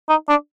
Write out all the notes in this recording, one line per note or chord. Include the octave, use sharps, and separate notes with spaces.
D#4
D4